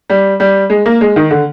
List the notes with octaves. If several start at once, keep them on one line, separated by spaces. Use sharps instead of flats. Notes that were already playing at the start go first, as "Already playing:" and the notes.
G3
G3
G#3
A#3
G#3
D#3
D3